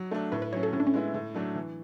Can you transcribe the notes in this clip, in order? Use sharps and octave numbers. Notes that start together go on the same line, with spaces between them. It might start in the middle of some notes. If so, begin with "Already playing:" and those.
Already playing: F#3
A3 D4
A2 B4
B4
F#3 C#4 C#5
A4
A2 C#4
D4
C#4
G#3 B3 E4
A2
F#3 A3 D4
E3